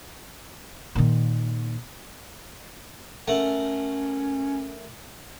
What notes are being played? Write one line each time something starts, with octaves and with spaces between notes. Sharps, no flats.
A#2 D#3
A3 C#4 A#4 F#5